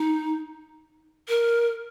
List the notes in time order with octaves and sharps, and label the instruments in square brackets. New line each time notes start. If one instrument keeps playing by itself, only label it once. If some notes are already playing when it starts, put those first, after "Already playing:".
Already playing: [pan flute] D#4
A#4